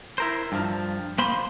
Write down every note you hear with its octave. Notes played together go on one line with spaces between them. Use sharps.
E4 A#4 C5
G2 F3
A#3 C5 B5 C6